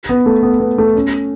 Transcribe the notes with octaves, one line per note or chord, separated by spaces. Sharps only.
B3
A3
B3
B3
A3
C#4